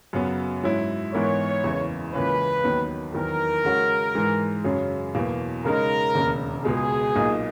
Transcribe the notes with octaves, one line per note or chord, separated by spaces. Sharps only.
F#2 C#3 F#3 B3
G#2 F#3 C#4 E4
G#2 E3 B3 E4 A#4 C#5
F#1 E2 C#3
C#2 C#3 E3 A#3 C#4 B4
D#2 D#3 F#3 B3
E2 D#3 F#3 A#4
C#3 G#3 C#4 F#4
G#2 E3 G#3
F#2 C#3 F#3 C#4 G#4
E2 B2 F#3 A#3
C#3 G#3 D#4 A#4
E1 D#2 C#3
C#2 B2 G#3 G#4
B1 A#2 A#3 D#4